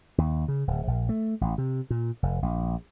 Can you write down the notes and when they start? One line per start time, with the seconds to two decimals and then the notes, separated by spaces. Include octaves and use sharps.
0.18 D#2
0.48 C#3
0.67 D1
0.87 A#1
1.09 A3
1.41 A1
1.58 C3
1.90 A#2
2.23 F1
2.42 A#1